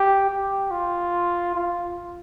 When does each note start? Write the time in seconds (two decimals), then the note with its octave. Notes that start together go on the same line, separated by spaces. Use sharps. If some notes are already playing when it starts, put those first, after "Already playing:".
Already playing: G4
0.30 G4
0.71 F4
1.55 F4